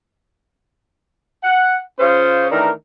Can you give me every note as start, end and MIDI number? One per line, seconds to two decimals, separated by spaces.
1.43 1.77 78
1.99 2.45 49
1.99 2.45 61
1.99 2.45 65
1.99 2.45 72
2.50 2.70 51
2.50 2.70 52
2.50 2.70 57
2.50 2.70 62
2.50 2.70 70